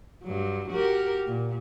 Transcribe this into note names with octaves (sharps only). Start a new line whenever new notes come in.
G2 F#3
F#4 G4 A#4
A#2